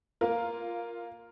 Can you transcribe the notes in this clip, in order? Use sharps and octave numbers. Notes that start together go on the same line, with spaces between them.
A#3 F4 A#4 F5